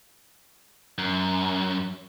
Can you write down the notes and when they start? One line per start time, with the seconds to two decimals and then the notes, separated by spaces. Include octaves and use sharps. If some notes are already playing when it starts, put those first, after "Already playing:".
0.98 F#2